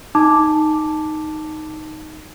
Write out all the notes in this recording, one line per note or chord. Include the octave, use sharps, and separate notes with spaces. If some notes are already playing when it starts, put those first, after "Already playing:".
D#4 A5 D6